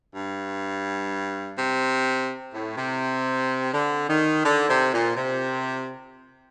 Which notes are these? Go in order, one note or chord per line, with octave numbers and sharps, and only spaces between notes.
G2
C3
A2
C3
D3
D#3
D3
C3
A#2
C3